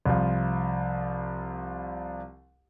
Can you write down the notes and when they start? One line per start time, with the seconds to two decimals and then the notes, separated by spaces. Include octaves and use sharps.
0.06 C2 F3